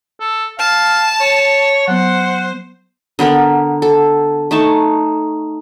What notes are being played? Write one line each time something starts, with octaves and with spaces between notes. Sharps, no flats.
A4
F5 A5
C#5
F#3 B3 C5 F#5
D3 B3 A#4 B5
A4
A3 D#4 A5 C#6